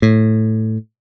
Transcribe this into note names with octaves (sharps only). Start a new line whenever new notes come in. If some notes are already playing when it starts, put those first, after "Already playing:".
A2